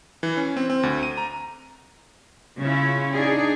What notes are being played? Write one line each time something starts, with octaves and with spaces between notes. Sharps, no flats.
E3
C#4
C4
C4
D2
D#7
A#5
C#3 C#4 E4 F4
D4 D#4 G#4 D5